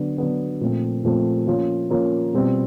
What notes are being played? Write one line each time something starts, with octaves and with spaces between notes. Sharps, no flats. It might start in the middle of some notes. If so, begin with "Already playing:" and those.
Already playing: D3 F#3 B3 D4
D3 F#3 B3 D4
A#2 F3 A3 C4
A#2 F3 A3 C4
F3 A#3 C#4 F4
F3 A#3 C#4 F4
B2 G3 C4 F4